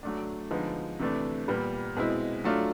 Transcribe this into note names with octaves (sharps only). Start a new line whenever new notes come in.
F#3 A3 D4
D3 F3 G#3 B3 D#4
C3 E3 A3 D4
A#2 G3 B3
B2 G#3 C4 E4
F#3 A3 D4 F4